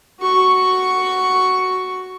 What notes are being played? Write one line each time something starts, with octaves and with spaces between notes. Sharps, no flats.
F#4 C#6